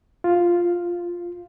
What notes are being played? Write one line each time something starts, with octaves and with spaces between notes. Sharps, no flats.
F4